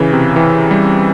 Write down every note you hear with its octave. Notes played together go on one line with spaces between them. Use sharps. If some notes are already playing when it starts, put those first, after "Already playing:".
Already playing: C#3 E3
C3
E3
G3